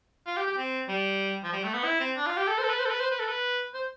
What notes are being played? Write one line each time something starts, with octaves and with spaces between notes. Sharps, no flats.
F4
G4
G4
C4
G3
F3
G3
A3
B3
E4
C4
D4
F4
G4
A4
C5
A4
B4
C5
A4
B4
C5
B4
A4
B4
C5